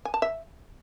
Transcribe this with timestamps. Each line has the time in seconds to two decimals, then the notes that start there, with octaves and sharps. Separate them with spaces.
0.05 G#5
0.14 A5
0.22 E5